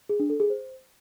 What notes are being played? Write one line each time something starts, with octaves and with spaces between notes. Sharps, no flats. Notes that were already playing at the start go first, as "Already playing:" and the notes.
G#4
D4
A4
G#4
C5